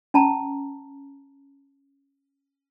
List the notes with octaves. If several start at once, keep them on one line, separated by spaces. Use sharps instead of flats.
C#4 A5 A#5